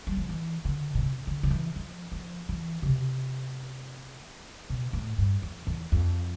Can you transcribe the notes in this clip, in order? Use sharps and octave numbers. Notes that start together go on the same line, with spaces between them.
G3
F3
E3
D3
B2
C3
D3
D3
E3
F3
F3
E3
B2
C3
B2
A2
G2
F2
E2
F2